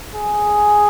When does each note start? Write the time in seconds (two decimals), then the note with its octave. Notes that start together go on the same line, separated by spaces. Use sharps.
0.14 G#4